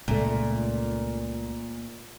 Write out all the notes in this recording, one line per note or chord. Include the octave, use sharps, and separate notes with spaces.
C#2 A#2 A3